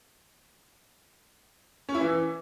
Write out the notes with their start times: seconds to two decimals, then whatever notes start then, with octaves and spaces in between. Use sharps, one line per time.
1.89 C#4
1.94 E4
2.00 E3